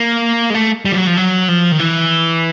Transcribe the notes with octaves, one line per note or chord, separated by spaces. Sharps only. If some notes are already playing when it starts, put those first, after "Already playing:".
Already playing: A#3
G#3
A3
G3
F3
F#3
F3
F#3
F3
D#3
E3